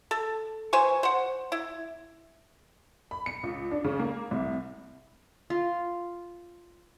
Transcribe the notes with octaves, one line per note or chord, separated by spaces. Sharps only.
A4
E3 C5 G#5 C#6
C5 F#5
E4
B5
C#7
C#2
D4
C#3
A#3
C2
F4